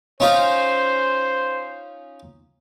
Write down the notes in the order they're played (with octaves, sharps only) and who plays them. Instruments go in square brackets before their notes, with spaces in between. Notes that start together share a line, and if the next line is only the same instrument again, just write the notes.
[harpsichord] C#4 D#4 F4 [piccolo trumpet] C5